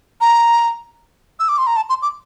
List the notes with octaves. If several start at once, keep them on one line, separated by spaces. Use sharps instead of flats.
A#5
E6
D6
C6
A#5
A5
C6
D6